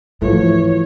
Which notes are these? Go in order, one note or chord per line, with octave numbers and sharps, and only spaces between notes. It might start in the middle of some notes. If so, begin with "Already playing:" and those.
G#2 E3 F3 A3 C#5